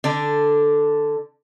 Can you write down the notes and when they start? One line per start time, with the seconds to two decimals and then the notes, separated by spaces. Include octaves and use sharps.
0.04 D3 D4